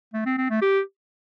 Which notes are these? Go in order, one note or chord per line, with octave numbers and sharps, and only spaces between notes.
A3
C4
C4
A3
G4